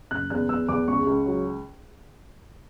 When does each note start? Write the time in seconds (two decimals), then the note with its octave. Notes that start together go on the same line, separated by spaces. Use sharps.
0.11 F#1 F#6
0.30 E2 F#6
0.49 E2 E6
0.68 E2 D6
0.88 C#2 C#6
1.07 C#2
1.26 F#3